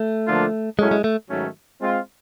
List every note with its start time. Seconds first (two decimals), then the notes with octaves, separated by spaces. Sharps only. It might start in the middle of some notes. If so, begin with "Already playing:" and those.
Already playing: A3
0.28 D3 F3 A#3 D4 F4
0.79 A2 F#3 G#3 A3 C#4 E4
0.91 G#3
1.04 A3
1.30 G#2 D#3 F#3 A3 C#4
1.81 G#3 C4 F4